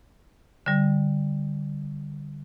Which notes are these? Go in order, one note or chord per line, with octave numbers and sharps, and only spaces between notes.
D3 G3